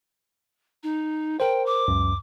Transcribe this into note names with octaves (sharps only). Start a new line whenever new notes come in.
D#4
A#4 C5 G5
D6
C#2 F#2